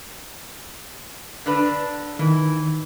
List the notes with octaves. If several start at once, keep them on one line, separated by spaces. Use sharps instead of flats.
D3 D4 B4
D#3 E3